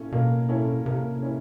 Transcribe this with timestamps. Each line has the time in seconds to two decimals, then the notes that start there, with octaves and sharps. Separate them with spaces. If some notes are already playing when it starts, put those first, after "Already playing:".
Already playing: A#3 C#4 E4 A4
0.12 B2 A#3
0.49 C#4 E4 A4
0.86 C3 A#3
1.23 C#4 E4